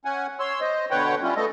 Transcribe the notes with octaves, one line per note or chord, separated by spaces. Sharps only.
C#4 F#5 G#5
C#5 C6 E6
C5 D#5
B2 D3 B4 C#5 F#5 G5
G3 C#4 E4 F4
A3 B3 A4 D#5